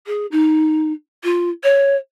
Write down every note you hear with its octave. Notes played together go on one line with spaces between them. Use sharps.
G#4
D#4
F4
C#5